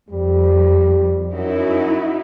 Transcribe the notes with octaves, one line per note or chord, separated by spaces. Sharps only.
F2 G3
F#2 D#4 E4 F#4